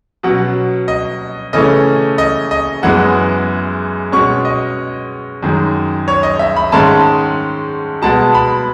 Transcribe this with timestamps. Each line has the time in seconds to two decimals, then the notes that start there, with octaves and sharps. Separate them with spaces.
0.23 B2 F#3 C#4 F#5
0.88 D#5
1.53 C#3 E3 A3 C#4 D#5
2.18 D#5
2.51 D#5
2.83 F#2 E3 G#3 B3 F#5
4.12 B2 G#3 C#4 C#6
4.45 D#5
5.43 F#2 D#3 G#3
6.08 C#5
6.23 D#5
6.39 E5
6.56 B5
6.72 G#2 D#3 G#3 C#4 A5
8.02 B2 G#3 B3 A5
8.35 B5